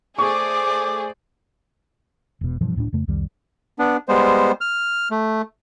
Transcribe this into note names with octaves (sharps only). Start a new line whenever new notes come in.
A3 G#4 C5 D5 C#6 D6
E1 B2
G2 B2 E3 F3
D1 A2 C4 D4
F2 C#3 A3
C2 F2 D#3 G3
B3 D4
G3 G#3 B3 C5
F6
A3